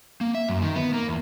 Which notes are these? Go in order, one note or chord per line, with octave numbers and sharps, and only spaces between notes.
A#3
E5
F#2
D#3
B3
A#3
E2